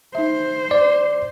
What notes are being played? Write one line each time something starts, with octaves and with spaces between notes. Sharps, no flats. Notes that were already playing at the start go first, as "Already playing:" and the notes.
D#4 C5 E5
D5